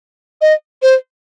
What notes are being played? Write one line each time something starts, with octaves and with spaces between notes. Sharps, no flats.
D#5
C5